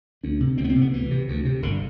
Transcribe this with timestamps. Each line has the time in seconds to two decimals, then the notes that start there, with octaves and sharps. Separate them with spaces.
0.23 D2 D4
0.40 C3
0.58 D2 C4
0.64 B3
0.69 C4
0.75 C3
0.81 B3
0.93 D2 E3
1.11 C3
1.28 D2
1.45 C3
1.62 G1 D3